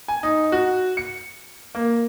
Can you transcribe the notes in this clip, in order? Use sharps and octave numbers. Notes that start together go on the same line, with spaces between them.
G#5
D#4
F#4
C#7
A#3